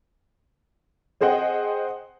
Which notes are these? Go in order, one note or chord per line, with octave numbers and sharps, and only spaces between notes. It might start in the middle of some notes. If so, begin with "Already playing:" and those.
C4 G#4 C5 D#5 F#5 G5